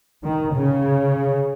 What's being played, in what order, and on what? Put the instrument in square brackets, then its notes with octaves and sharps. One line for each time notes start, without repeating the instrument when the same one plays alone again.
[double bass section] D#3
C#3